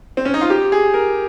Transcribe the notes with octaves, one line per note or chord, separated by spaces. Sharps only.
C4
C#4
D#4
F4
G4
G#4
A#4